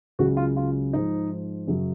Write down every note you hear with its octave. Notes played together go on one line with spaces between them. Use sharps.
C#2 C#3 F#3 F#4
F4
F4
G#2 F3 D#4
F#2 C#3 F#3